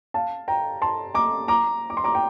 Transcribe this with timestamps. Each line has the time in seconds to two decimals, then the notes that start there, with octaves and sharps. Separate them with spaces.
0.14 F5 A5
0.48 G5 A#5
0.82 A5 C6
1.14 A#5 D6
1.48 A#5 D6
1.90 D6
1.97 C6
2.04 A#5 D6
2.15 G5